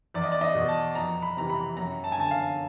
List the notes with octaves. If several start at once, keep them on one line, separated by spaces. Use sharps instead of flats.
E2 D5
D#5
D5
D#5
B2
A5
F2 A#5
B5
C3 E3 A#5
B5
F#2 A#5
A5
G#5
D3 A5
F5